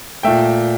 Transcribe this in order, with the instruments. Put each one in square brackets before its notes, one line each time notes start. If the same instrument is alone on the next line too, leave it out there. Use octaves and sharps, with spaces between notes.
[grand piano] A#2 A3 E5 G5